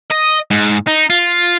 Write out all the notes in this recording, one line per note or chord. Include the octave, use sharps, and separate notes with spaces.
D#5
G#2
D#4
F4